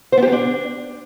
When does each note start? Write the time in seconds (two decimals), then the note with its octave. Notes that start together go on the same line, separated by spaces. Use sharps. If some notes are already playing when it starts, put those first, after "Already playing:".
0.12 C5
0.17 B3
0.22 G4
0.27 B3
0.32 D4